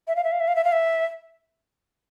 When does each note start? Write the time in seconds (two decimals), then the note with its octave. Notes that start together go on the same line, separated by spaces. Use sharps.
0.08 E5
0.16 F5
0.24 E5
0.32 F5
0.40 E5
0.48 F5
0.56 E5
0.64 F5
0.72 E5